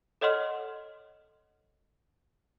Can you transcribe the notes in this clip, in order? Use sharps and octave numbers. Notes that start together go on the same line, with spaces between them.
A4 C#5 D#5 F#5 C6 F6